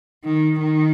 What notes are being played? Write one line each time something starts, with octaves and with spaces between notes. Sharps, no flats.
D#3
D#3